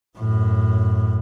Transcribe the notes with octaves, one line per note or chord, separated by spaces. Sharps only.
F#2 A2